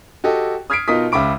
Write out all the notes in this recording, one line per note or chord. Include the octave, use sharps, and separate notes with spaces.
F#4 G4 A4 D#5
D#6 F6 G#6 B6 C7 D7
B2 D#4 F4 A#4 D#6 B6
C#2 C#3 E5 B5 D6 D7